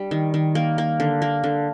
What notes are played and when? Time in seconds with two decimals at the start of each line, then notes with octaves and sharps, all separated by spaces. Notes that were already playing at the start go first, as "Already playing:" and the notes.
Already playing: G3 D4
0.11 D#3
0.34 D#3
0.55 A#3
0.78 A#3
1.00 D3
1.22 A#3
1.44 D3